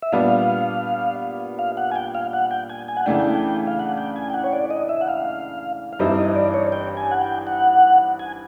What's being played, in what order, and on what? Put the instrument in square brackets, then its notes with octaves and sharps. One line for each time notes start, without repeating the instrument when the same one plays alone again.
[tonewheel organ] E5
[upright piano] A#2 G3 B3 D4 [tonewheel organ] F5
[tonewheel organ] F5
F#5
G#5
G5
F5
F#5
G5
G#5
G#5
F#5
[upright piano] C#3 E3 A3 D4 [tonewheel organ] G5
[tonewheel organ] F5
F#5
G5
G#5
G5
F#5
C#5
D5
D#5
E5
F#5
F5
F5
[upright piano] G2 E3 G3 C4 D#4 [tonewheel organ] E5
[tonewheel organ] D#5
D5
C#5
G5
G#5
F#5
G5
F#5
G#5